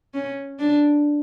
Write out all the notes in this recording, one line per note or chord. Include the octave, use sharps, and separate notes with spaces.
C#4
D4